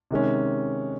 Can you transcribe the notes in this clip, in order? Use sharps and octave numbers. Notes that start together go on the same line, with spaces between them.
C3 D#3 G#3 C#4